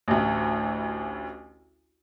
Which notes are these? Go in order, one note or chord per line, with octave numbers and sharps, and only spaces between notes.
A1 D2